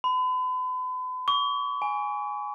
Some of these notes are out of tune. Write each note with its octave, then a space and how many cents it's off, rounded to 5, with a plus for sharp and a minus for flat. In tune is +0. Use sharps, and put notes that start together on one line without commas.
B5 +40
C#6 +40
G#5 +0